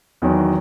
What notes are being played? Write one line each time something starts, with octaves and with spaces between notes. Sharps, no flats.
E2 D#3 F#3